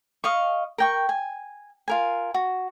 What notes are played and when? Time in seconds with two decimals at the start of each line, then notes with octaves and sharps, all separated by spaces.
0.24 D#5 F5 C#6
0.78 A#4 G5 C#6
1.09 G#5
1.88 F4 A#4 G#5
2.34 F#4